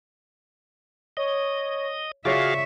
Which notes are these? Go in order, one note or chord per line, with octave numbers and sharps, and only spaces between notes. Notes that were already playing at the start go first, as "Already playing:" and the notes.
C#5 D#5
C#3 F4 F#4 G#4 D5 E5 F5 C#6